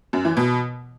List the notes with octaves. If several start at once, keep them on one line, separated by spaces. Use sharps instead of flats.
F#2
E3
B2